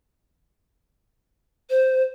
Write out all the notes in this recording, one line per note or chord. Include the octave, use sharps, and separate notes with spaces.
C5